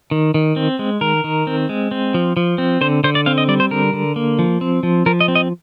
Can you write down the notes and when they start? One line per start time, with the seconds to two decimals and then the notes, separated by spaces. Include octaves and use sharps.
0.11 D#3
0.34 D#3
0.56 C4
0.79 G#3
1.01 D#3 A#4
1.24 D#3
1.47 C4
1.69 G#3
1.91 C4
2.14 F3
2.37 F3
2.58 C4
2.81 D3 C5
3.04 D3 C5
3.15 D5
3.26 C4 F5
3.38 D#5
3.48 G3 D5
3.60 C5
3.71 D3 A#4
3.93 D3
4.16 A#3
4.39 F3
4.61 C4
4.83 F3
5.06 F3 A#4
5.20 D#5
5.28 C4
5.35 D#5